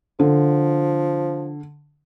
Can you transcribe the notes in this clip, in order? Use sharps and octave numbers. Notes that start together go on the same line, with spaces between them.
D3 F3